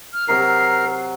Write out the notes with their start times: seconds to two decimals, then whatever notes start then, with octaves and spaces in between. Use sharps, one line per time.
0.13 F6
0.28 C3 F#3 A#4 C7